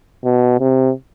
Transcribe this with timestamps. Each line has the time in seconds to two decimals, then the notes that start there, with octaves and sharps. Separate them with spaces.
0.25 B2
0.60 C3